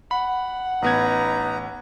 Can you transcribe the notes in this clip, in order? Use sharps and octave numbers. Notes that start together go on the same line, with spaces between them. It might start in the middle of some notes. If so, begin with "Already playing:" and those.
F#5 B5
A1 B3 D#4 B4 A#5 G#6